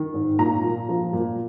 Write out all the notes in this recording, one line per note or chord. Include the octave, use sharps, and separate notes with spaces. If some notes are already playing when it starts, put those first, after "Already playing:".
Already playing: D#3
G#2
A#2 A#5
A#2
F3
A#2